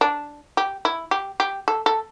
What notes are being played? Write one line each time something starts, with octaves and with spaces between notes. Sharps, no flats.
D4
G4
E4
G4
G4
A4
A4